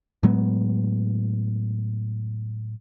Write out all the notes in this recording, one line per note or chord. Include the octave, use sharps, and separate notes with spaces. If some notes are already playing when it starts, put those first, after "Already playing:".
A2 F#3 G#3 B3